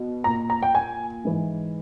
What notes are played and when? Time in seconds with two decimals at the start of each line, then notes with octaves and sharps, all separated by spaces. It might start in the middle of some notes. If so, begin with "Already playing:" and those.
Already playing: B2
0.24 A#2 A#5
0.50 A#5
0.63 G5
0.75 G#5
1.25 G#2 E3